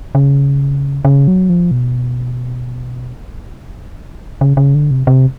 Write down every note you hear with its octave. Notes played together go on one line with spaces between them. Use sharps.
C#3
C#3
F#3
F3
B2
C#3
C#3
D3
C3
C3